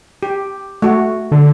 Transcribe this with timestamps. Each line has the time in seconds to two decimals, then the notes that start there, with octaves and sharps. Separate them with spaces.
0.23 G4
0.82 A3 F#4
1.32 D3